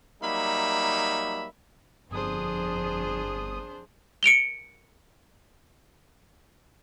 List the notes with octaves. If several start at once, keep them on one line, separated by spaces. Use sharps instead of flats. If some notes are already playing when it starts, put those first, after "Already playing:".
F#3 G3 A#3 D#4 E5 B5
G1 F2 D4 G#4 C5 D#6
C#7 D7 F7 G7